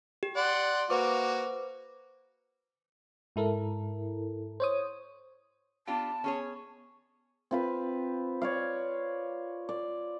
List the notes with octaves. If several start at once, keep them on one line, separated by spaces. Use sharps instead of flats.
G4
D5 F#5 C6
A#3 F#4 B4 C5 D6
G#2 E4 A4 A#4
C5 C#5 D#6
B3 D4 F4 G4 A5
C#4 G#4 C#5
C4 F4 B4
C#5 D5 F5
D5